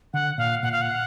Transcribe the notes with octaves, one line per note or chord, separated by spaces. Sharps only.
D3 F#5
A#2 F5
A#2 F#5
F5
F#5